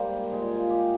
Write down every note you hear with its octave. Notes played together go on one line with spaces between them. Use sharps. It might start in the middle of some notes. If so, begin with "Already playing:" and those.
Already playing: G#2 G3 A#3 C5
A#4
A#2 G#3 G#4
F4
G4